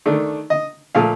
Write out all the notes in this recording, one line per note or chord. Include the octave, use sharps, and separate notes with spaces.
D#3 A3 D4
D#5
A#2 F3 A3 F5